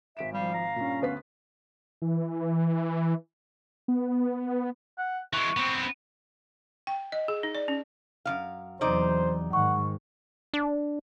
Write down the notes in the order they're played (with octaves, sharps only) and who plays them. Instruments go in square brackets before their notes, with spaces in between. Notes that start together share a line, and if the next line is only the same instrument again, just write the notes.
[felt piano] G#1 D7 E7 [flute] E5
[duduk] F3 [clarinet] G3 [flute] F5
[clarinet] A#5
[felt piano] G2 A#2 [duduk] C#4
[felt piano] D2 B4 B6 [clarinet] B3
[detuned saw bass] E3
B3
[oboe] F#5
[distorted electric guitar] E3 G#3 [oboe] C#6
[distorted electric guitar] B3 C4
[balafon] G5
D#5
G#4
D#4
D5
C#4
[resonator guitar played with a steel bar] F#2 D#3 F5
[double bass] E2 F#3 [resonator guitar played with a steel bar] C3 D#4 D5 [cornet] C5
[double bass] G#2 D#3 [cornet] F#5 [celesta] C#6
[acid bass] D4